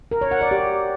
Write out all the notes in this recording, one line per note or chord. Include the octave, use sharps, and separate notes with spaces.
A#4
C#5
F#5
D5
G4